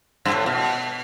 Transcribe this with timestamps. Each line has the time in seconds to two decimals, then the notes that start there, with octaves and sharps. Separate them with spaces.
0.25 G2
0.32 A2
0.46 B2